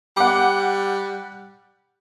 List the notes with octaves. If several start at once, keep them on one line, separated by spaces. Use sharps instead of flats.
G3 F#5 D6